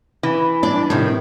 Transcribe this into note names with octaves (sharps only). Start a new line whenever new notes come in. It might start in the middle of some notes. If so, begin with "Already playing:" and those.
E3
D4 D5
A2 C3 D#3